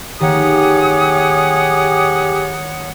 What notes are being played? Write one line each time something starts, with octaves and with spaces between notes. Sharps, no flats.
D#3 A#3 G4 G#4 C#5 F#5 D#6